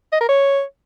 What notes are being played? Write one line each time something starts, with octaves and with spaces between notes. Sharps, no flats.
D#5
A#4
C#5